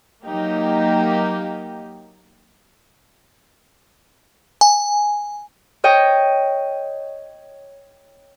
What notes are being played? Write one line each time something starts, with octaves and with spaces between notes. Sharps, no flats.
F#3 A#3 D#4 G4
G#5
C#5 D#5 G5